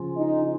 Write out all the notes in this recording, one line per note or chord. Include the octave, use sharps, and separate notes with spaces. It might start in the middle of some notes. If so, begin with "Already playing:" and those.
Already playing: C#3 F3 C#4 F4
D#4